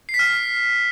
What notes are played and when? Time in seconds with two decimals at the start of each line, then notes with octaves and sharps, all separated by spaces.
0.09 C7
0.14 B6
0.19 F6